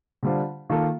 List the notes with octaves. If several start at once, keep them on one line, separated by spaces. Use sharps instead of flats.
D3 G3 D4 F4 C5
D#3 A#3 F4 A4